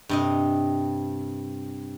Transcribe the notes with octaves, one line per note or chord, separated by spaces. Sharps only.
G2 C3 D#5